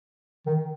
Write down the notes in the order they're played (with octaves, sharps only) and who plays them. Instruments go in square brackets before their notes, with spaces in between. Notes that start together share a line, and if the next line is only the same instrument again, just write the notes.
[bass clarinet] D#3